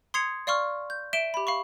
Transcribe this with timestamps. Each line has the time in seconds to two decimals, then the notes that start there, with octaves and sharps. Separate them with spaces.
0.14 C6 D#6 G#6 C7 C#7 F7
0.47 D5 F5 C6 C#6 F6
0.90 G6
1.13 E5 D7 E7 G7
1.34 G4 B5
1.47 F5 B5 C#6